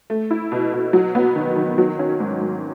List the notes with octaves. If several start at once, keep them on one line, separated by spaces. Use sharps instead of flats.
A3
E4
B2
B2
F#3
B3
D#3
D#3
F#3
C#4
G#2
G#2